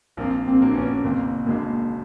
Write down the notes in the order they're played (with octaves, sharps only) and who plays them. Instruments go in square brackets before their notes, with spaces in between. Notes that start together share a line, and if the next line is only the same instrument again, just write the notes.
[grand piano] A#1 [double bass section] A#3 C4
[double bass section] A#3 C4
[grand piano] A#2 F#3 A#3 D4
[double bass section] B3 C#4
[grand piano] F#1 [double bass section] A#3 C4
[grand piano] F#2 D3 [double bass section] G#3 A#3